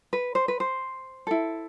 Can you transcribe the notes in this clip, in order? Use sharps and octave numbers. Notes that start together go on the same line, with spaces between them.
B4
C5
B4
C5
E4 A4